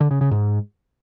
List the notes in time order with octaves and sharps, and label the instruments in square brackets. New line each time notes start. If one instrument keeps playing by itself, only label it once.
[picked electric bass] D3
C#3
C#3
G#2